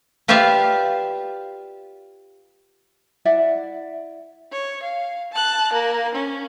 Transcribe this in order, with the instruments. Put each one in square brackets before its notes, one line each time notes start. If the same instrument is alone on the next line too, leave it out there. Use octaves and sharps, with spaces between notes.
[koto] F4 G4 B4 D5 E5 F5
[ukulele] E4 D5 E5 F#5
[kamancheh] C#5
F5
A5 F#6
A#3 A#4
C#4